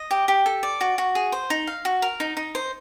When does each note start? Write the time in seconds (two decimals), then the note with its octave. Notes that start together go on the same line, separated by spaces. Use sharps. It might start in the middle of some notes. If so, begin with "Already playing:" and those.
Already playing: D#5
0.11 G4
0.28 G4
0.46 A4
0.63 D5
0.81 F#4
0.98 F#4
1.15 G#4
1.32 C5
1.50 D#4
1.67 F5
1.85 F#4
2.02 A#4
2.20 D#4
2.37 D#4
2.55 C5